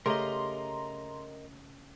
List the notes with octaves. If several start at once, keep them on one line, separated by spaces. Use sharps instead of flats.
C#3 A3 G4 A#4 D#5 A#5 C6